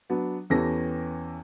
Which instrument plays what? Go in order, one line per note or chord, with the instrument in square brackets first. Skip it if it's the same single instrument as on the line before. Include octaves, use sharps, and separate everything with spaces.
[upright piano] F#3 B3 D4
E2 E3 C#4 G4 A4 A#6